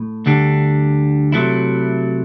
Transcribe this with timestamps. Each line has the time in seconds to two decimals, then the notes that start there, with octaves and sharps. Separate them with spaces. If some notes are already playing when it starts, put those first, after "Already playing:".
Already playing: A2
0.26 D2 D3 G3 D4
1.32 C3 F#3 A3 E4